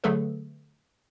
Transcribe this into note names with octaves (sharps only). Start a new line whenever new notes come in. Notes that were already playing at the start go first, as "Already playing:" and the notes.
D3 F#3 A3 G#4 A4 B4